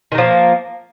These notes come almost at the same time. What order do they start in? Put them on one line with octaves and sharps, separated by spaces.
D#3 A#3 F3